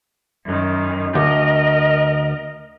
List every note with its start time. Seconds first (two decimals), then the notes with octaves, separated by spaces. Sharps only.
0.45 F#2 D#3
1.15 D2 A#4 D#5